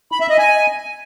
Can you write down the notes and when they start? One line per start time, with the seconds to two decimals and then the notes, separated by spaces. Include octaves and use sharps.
0.12 B5
0.21 E5
0.29 D#5
0.38 G#5